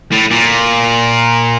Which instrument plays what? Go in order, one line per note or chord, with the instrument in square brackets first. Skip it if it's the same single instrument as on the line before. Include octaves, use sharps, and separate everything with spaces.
[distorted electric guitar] A2
A#2